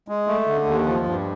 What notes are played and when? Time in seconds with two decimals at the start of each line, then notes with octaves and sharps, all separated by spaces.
0.08 G#3
0.27 A3
0.47 D3
0.66 D#2
0.86 F3
1.05 G2